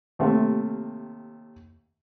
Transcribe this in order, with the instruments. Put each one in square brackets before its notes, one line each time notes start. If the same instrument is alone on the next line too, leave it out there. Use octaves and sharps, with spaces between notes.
[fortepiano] D#2 C3 A3